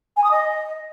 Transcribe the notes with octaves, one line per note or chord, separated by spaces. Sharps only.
G#5
D#6
D#5